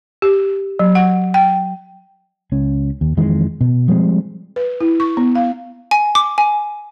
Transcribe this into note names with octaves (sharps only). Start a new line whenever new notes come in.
G4
F#3
F#5
G5
C#2 C#4
D#2
F2 D#3 E3 G#3
B2
F3 G3 G#3 C4
B4
E4
C#6
B3
F5
G#5
D6
G#5